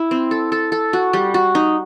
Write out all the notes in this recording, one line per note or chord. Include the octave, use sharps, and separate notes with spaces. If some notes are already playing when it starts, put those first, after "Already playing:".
Already playing: E4
C4
A4
A4
A4
F#4
G3
F#4
D#4